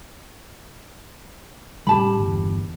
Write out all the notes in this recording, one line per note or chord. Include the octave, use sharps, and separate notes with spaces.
A2 C#3 G3 G4 A5 B5
G1 E2